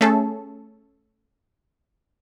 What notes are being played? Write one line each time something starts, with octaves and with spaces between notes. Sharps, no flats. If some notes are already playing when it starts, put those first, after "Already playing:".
A3 C#4 G#4 A4